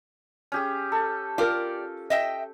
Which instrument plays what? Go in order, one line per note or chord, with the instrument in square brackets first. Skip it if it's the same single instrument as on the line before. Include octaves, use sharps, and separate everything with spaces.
[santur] C#4 G4 G#4
A4
[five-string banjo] F4 A#4 [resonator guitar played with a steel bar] G4 D5
[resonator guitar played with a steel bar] D#5 E5 G5